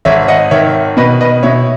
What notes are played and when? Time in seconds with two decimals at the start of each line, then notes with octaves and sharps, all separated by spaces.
0.05 G#1 C#5 E5
0.28 D#5 F#5
0.51 D#3 C#5 E5
0.97 B2 B4 D#5
1.21 B4 D#5
1.43 B2 C#5 E5